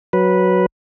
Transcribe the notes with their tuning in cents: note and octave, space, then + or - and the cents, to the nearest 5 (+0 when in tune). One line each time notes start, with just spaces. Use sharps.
F#3 +0 B4 -10